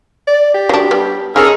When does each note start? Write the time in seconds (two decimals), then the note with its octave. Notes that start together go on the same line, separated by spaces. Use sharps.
0.27 D5
0.54 G4
0.69 F#3 D4
0.91 G3 B3
1.36 D#3 C#4 D#4 G#4 A4 F6